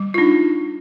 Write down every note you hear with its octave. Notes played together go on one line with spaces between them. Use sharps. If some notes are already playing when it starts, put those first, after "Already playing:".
Already playing: G3
F4
D4 D#4